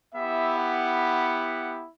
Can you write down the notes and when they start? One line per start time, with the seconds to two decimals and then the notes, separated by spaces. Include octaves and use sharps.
0.15 B3 E4 G4 E5
0.58 F#5